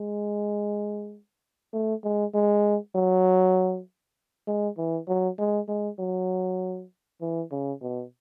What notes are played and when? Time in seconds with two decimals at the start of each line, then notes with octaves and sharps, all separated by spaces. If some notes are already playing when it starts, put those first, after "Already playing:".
Already playing: G#3
1.73 A3
2.04 G#3
2.34 G#3
2.95 F#3
4.47 G#3
4.78 E3
5.08 F#3
5.39 G#3
5.68 G#3
5.99 F#3
7.21 E3
7.51 C#3
7.82 B2